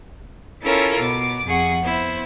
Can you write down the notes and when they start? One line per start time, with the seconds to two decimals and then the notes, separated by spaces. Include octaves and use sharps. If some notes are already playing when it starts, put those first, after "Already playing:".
0.63 C#4 E4 F4 A4 A#4 C#5
0.99 B2 D6
1.45 F2 G#4 F#5 C#6
1.82 B3 E4 C5